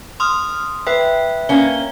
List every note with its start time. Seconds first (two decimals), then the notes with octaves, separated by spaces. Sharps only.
0.20 C6 D#6 F6
0.87 B4 E5 G5
1.49 A#3 C#4 G7